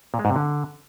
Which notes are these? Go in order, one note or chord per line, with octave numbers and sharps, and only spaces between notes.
A#2
G#3
G#2
C3
D3